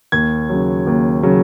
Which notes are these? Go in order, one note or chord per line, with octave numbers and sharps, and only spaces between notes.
D#2 G#6
C#3 F#3
D#2
C#3 F#3